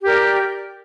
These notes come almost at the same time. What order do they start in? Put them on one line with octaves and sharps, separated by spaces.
G4 A#4 D5